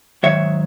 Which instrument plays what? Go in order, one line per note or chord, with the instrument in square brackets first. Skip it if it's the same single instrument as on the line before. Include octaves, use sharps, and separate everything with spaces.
[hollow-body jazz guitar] G#2 D#3 F#3 C#5 E5